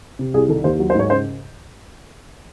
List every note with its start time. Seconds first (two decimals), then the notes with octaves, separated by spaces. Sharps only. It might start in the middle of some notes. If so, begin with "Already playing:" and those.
0.19 C3
0.34 C2 G#4
0.49 D#3 A4
0.64 D#2 C5
0.79 F#3
0.90 C5
0.95 G#2 C#5
1.10 C#3 C5